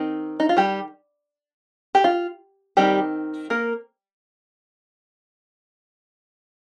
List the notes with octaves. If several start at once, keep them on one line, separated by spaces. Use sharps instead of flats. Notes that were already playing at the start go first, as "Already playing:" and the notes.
Already playing: D#3 C4 D#4
D#4
F4
G3 G4
G4
F4
D#3 G3 C4 D#4 G4
A#3 A#4